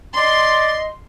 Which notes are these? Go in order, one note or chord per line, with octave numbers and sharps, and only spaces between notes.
D5 D#5 C6